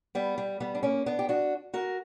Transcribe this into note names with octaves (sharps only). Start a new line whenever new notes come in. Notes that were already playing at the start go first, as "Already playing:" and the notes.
G3 B3
G3
G3 B3
D4
A#3 C#4
B3 D4
G4
D4 F#4
F#4 A#4